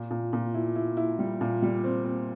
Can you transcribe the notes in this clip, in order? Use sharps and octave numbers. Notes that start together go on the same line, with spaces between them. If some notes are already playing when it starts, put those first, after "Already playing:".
Already playing: A#2
A#2
A#2
E4
E4
E4
G3
A#2
G3
C4
C4